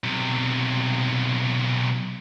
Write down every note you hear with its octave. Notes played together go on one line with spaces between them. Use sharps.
B1 C3